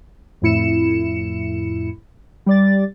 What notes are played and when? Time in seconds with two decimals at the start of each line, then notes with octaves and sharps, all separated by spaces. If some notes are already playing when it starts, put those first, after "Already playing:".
0.42 F2 A2 E4 C#7 E7
2.46 G3 D5 A6